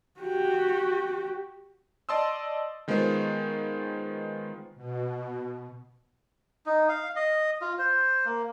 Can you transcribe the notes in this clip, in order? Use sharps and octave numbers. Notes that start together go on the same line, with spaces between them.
F#4 G4
D5 D#5 A5 C6 D#6 E6
D#3 G#3 B3 F4 C5
B2
D#4
F5
D#5
F4
C5
A#3